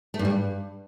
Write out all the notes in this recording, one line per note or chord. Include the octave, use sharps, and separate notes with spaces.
A3
G2
G3
G2